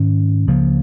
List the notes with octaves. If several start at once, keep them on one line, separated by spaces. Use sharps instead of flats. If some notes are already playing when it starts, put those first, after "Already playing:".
Already playing: G#2 D#3 C#4
C#2 C#3 F3 A#3